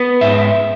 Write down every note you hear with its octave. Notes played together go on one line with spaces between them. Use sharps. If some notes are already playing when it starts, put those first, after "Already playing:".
Already playing: B3
G#2 E5